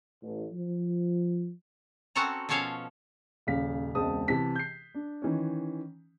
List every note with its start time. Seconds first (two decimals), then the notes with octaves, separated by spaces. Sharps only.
0.23 A1
0.53 F3
2.15 C4 C#4 F#4 A4 F#5 A#5
2.49 B2 F3 C#4 A4 C#5 F5
3.47 D#1 C#3 F5 B6
3.95 E1 C#2 C4 A5 D#6
4.28 C3 E3 G4 A5 B6
4.56 G6 C7
4.94 D4
5.22 D#3 E3 C#4